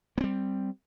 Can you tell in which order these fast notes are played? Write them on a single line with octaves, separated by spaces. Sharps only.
A#3 C4 G3